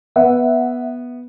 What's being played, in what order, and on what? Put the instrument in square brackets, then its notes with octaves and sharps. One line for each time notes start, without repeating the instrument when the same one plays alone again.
[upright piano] B3 [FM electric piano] E5 F#5